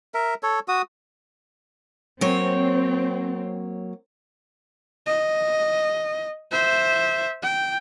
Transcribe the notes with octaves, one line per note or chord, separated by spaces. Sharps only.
A#4 E5
A4 C#5
F#4 D#6
F#3 A#3 C4 C#5
D#5
C5 E5
G5